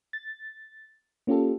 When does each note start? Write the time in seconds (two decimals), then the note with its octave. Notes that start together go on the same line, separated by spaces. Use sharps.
0.13 A6
1.27 A#3 C#4 F4 G4 A4